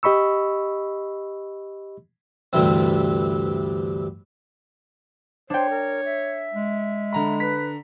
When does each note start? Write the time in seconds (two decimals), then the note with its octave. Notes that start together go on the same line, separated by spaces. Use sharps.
0.03 G4 D#5 B5 C#6 E6
2.53 D2 G2 C3 E3 C4
5.50 D4 C5 C#5 G5
5.70 A#4
6.05 E5
6.54 G#3
7.13 D3 A#5 B5
7.40 B4 B6